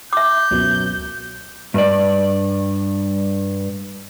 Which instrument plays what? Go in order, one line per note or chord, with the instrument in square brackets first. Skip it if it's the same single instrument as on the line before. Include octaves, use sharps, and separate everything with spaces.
[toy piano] E5 D6 [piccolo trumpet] G6
[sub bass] C#2 [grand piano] F#2 B2 F#3
[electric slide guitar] G2 D5